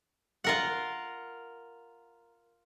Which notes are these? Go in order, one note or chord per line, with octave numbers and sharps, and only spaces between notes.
F4 A#4 F#5